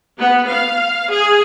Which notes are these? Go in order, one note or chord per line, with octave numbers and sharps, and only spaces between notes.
B3
F5
G#4